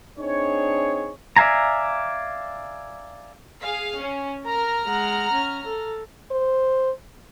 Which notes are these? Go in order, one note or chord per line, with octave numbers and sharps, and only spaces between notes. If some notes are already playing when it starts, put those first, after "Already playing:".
C4 D4 D#4 G#4 C#5
D5 E5 F5 G#5 A#5
G#4 F5
C#4
A#4 A#5 F6
G#3 F#5
C#4
A4
C5